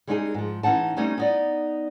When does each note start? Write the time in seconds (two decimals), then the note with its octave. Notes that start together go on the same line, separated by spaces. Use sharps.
0.07 G3 G#3 C4 D#4 F#4 G#4
0.34 G#2 F3
0.63 E3 C#4 D#4 F#5 A5
0.97 G3 A3 C4 C#4 D#4
1.18 B3 D#4 D5